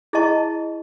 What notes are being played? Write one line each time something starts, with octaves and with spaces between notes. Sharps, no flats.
E4 G#4 D#5 A5 C#6